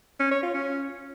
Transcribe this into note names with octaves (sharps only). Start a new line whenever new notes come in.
C#4
C#5
F4
C#4